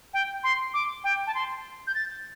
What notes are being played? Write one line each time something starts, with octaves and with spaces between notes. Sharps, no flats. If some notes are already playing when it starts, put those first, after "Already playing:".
G5
C6
D6
G5
A5
C6
G6
A6